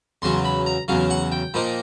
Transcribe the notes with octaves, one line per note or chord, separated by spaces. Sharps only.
E2 C#3 F#3 C6
B5
A#5
E2 C#3 F#3 F5
F#5
G5
A#2 F3 A#3 D#4